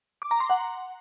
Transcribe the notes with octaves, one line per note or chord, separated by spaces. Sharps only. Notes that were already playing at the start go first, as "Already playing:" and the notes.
D6
A#5
C6
F#5